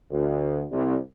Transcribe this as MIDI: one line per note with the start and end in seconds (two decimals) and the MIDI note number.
0.11 0.62 38
0.70 0.96 36